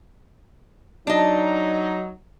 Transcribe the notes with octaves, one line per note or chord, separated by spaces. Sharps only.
F#3 D4 D#4 D#5